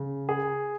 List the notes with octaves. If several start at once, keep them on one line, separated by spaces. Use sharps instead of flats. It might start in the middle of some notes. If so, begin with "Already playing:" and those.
Already playing: C#3
G#4